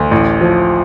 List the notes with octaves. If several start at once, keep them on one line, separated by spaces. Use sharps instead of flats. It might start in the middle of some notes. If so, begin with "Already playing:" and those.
Already playing: D2
A1
F3